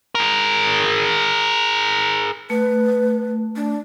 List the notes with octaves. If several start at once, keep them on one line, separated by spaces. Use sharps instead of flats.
G#4 A#4
A3 B4
D4